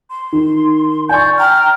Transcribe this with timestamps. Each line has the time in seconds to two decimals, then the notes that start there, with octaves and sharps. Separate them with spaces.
0.10 C6
0.33 D#3
1.09 D5 G#5 C#6 G6
1.37 G5 A#5 F6